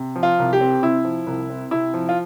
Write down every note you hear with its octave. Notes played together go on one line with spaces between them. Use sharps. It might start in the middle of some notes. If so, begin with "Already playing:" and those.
Already playing: C3
F3
F4
C2
G4
C4
C3 E4
F3
C2
C4
C3 E4
F3
F4